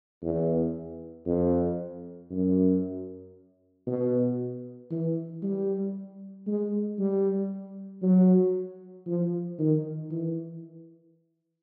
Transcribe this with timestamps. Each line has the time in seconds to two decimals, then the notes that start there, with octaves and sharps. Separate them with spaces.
0.22 E2
1.26 F2
2.31 F#2
3.87 B2
4.90 E3
5.42 G3
6.47 G#3
6.99 G3
8.02 F#3
9.07 F3
9.59 D#3
10.11 E3